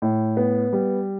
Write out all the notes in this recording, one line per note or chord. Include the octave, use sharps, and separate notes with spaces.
A2
B3
G3